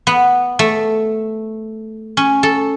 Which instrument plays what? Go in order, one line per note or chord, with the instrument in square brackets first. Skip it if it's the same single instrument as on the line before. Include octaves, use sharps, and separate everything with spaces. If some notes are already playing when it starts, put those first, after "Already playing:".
[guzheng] B3
A3
C#4
A4